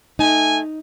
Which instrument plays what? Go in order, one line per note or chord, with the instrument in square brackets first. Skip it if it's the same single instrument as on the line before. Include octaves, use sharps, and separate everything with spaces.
[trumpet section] A3 G#5 [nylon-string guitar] D#4